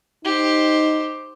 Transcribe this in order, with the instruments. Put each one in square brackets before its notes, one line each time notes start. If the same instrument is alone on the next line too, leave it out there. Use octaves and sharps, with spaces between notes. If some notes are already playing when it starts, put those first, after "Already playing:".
[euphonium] D#4 [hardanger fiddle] G4 C5